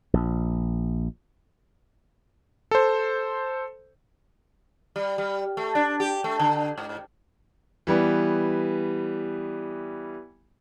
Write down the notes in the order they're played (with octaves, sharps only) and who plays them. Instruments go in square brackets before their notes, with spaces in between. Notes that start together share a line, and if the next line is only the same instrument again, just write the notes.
[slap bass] A#1
[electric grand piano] A4 C5
[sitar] G3
G3
A3
D4
G4
A3
D3
G#2
[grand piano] E3 G3 B3